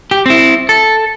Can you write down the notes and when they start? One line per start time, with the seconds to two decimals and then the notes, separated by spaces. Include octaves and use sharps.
0.11 G4
0.26 C4 E4
0.69 A4